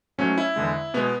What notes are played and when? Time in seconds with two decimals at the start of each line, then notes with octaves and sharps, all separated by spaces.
0.18 G#2 F#3 A3 C#4
0.38 E4
0.56 E2 D3 G#3
0.94 B2 G#3 B3